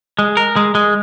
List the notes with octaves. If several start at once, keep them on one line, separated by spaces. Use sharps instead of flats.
G#3
A#4
G#3
G#3